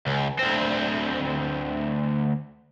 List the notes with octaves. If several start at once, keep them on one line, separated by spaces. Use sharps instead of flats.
C#2
D2 C4